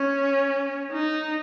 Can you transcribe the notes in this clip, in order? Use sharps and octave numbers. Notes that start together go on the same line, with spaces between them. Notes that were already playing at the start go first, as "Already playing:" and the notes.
Already playing: C#4
D#4